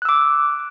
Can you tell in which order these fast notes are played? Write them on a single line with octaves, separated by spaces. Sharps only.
F#6 E6 D6